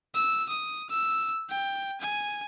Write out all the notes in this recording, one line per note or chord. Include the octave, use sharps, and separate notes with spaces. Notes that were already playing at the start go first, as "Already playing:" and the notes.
E6
D#6
E6
G5
G#5